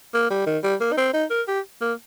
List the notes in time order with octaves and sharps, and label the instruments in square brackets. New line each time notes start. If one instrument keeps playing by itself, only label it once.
[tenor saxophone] A#3
G3
D#3
G3
A#3
D#4
C4
D#4
A#4
G4
A#3